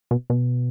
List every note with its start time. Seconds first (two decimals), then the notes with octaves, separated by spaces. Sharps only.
0.11 B2
0.30 B2